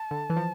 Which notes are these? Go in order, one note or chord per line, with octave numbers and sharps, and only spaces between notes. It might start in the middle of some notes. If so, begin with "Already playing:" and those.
Already playing: A5
D3
E3
F3